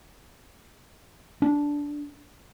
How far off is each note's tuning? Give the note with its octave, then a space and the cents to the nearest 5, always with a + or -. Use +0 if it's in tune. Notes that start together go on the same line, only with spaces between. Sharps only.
D4 -10